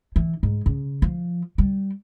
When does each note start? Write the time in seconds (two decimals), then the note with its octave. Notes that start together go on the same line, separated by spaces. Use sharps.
0.16 E3
0.43 G#2
0.66 C#3
1.02 F3
1.58 G3